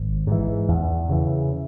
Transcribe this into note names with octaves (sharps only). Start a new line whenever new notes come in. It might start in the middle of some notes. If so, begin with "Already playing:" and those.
Already playing: G#1
G#2 E3
E2
C#3 E3